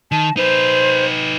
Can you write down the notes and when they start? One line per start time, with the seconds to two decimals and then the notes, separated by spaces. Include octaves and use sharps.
0.12 D#3 A5
0.37 D#4 B4 C5